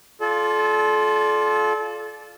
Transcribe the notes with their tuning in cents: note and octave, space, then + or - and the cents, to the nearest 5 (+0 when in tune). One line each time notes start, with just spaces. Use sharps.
F4 +0 A4 -35 D5 +0